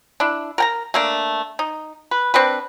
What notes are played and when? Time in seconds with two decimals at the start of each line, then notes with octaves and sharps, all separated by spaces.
0.20 D4 E4
0.58 A#4 G5 A#5
0.94 A3 A#3 D4
1.59 D#4
2.11 B4
2.34 C4 D4 B4